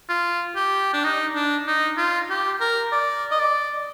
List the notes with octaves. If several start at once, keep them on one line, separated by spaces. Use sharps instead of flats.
F4
G4
D4
D#4
D4
D#4
F4
G4
A#4
D5
D#5
D5